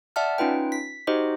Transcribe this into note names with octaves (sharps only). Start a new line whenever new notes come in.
D5 E5 F#5 A5 F6
C#4 D#4 F4 B4 G5
B6
D#4 F#4 G4 C5 D#5